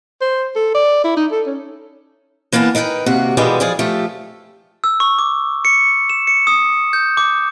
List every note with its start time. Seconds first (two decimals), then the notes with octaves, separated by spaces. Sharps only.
0.21 C5
0.56 A4
0.74 D5
1.04 E4
1.17 D#4
1.31 A4
1.46 C#4
2.52 E3 A#3 B3 G#5 A5
2.75 D#4 A#4 B4 F#5 G5
3.06 D#2 C3 A#3 F#4 F#5
3.37 B2 E3 G3 G#3 A#3 B3
3.60 F3 G#4 D5
3.79 F3 A3 G4 A4
4.84 E6
5.00 C#6
5.19 D6
5.65 C#7
6.10 E7
6.27 C#7
6.47 D#6
6.93 G6
7.17 D6